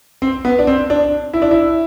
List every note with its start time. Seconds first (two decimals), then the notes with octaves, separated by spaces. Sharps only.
0.22 C4
0.45 B3
0.59 D4
0.67 C4
0.90 D4
1.33 E4
1.42 D4
1.51 E4